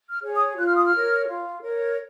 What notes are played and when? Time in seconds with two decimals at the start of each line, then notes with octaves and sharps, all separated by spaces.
0.10 F6
0.23 G#4 C#5
0.34 D#6
0.56 F4 F#6
0.66 F6
0.76 D#6
0.84 F6
0.92 A#4 C#5
1.27 F4
1.62 A#4 C#5